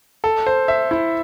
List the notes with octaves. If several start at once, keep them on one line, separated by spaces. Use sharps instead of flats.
A4
C5
E5
E4